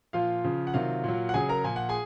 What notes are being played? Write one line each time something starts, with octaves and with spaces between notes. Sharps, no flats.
A#2 F3 F4 F5
C#3 F3
F#5
C3 D#3 F#3 F4 F5
A#2 F#3
F#5
C#3 F#3 G#4 G#5
A#4 A#5
A#2 F3 G#5
F#5
G#4 G#5